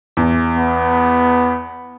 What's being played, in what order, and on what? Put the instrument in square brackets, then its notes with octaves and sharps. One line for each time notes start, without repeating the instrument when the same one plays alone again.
[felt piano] E2
[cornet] B3